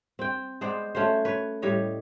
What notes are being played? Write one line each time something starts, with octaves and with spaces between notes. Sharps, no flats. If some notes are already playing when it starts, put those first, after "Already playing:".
C4 G5
G#3 B3 C5 D5
A3 C#4 F#4 C5
B4 C#5
A2 G3 C#5 D#5